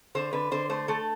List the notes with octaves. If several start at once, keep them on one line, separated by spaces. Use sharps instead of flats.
D3 C5
D3 B4
D3 C5
A3 C5
A3 A4